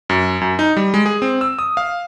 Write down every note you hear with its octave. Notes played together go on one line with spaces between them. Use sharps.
F#2
F#2
D#4
G3
G#3
G#4
C4
E6
D#6
F5